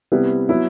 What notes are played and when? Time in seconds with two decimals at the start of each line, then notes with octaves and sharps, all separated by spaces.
0.12 C3 G3 B3 E4 B4
0.49 F#3 B3 E4